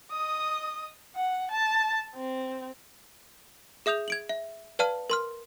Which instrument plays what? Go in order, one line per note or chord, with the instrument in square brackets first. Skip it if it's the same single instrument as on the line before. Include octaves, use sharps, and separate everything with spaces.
[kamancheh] D#5 D#6
F#5
A5
C4
[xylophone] G#4 E5 D#6 G6 F7
G#6 D7 F#7
E5
B4 D5 F5 A5 F6
A#4 C6 F6